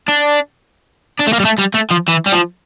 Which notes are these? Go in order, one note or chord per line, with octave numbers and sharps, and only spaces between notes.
D4
D4
A3
A#3
G3
A3
G3
A3
F3
E3
G3
F3